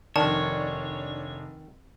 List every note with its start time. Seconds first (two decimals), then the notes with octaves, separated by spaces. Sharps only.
0.16 F1 D#3 D4 C#5 A5